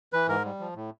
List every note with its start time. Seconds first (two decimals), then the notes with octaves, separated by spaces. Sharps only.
0.13 E3 B4
0.28 G#2 A#4
0.45 G3
0.60 F3
0.75 A2